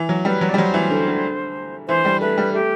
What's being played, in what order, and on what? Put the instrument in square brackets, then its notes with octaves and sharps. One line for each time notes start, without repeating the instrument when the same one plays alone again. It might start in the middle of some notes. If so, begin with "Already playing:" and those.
Already playing: [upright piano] E3
F#3
[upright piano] G3 [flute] B4
[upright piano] F#3
[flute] D5
[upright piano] G3
[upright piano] F#3 [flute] C5
[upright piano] E3
D3
D3
[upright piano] E3 [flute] C5
[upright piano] G3
[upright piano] A3 [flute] B4
[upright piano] G3
[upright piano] A3 [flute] G4